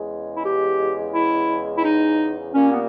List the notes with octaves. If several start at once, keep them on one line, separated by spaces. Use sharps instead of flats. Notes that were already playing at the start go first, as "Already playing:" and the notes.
Already playing: E2 C#3 G#3
E4
G4
E4
E4
D#4
A#2 G3 A#3 C#4
B3